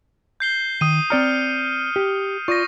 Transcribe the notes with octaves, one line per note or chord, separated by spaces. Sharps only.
G6 C7 G7
D#3 D#6 D#7
C4 D5 A#5 F6 C#7
G4
F4 D5 C#6 D#6 A#6